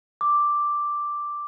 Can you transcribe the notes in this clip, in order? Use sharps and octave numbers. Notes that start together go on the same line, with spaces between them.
D6